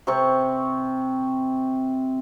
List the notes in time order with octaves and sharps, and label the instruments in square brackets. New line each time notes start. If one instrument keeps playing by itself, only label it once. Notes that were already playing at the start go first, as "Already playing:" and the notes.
[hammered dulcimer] C3 C4 C#6